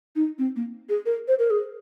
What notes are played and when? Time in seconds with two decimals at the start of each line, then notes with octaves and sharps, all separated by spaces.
0.16 D#4
0.38 C4
0.56 A#3
0.89 G#4
1.06 A#4
1.28 C5
1.39 A#4
1.50 G#4